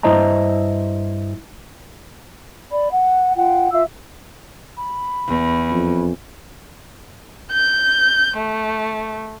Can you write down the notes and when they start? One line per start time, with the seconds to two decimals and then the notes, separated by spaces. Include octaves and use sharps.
0.03 G2 E4 C5 D#5 A5 A#5
2.71 D5 B5
2.90 F#5
3.36 F4 F#5 G5
3.71 F4 E5 F5 E6
4.77 B5
5.28 E2
5.71 F2
7.52 G6
8.37 A3